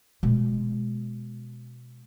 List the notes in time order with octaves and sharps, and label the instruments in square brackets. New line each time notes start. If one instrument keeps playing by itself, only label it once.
[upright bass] B2 G#3